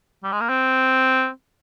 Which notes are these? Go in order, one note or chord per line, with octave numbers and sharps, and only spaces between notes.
G3
G#3
A#3
C4